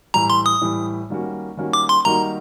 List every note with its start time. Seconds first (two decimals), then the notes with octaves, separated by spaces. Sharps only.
0.14 A2 E3 G3 A#5
0.30 C6
0.46 D#6
0.61 A2 E3 G3
1.10 D#3 G3 A#3 C#4 F#4
1.57 D#3 G3 A#3 C#4 F#4
1.73 D6
1.89 C6
2.05 D#3 G3 A#3 D#4 F#4 A#5